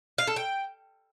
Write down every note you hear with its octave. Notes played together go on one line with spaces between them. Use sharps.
F5
A4
G5